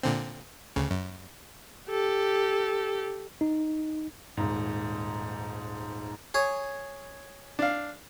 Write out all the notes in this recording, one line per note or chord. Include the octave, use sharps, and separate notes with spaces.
A#2 D3 C4
D2 C#3
F#2
G4 A4
D#4
D#1 G#2
G#4 C#5
D4 F5